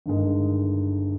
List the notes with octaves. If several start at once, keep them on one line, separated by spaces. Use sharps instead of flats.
G1 G2 D#3 G#3